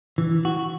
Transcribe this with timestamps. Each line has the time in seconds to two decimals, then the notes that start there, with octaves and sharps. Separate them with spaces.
0.18 E3
0.45 F#4